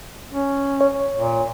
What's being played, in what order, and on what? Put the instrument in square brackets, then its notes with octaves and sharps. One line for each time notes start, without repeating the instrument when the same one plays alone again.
[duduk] C#4
[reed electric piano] C#5
[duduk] A#2